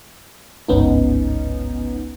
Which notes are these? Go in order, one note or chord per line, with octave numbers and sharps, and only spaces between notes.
G1 C#2 G#2 B3 C#4 D#4